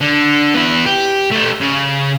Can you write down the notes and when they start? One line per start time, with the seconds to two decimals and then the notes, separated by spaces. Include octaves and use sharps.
0.01 D3
0.55 B3 E4
0.86 G4
1.32 A3 G4
1.61 C#3